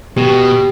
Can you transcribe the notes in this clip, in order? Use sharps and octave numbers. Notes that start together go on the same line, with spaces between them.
B2 G4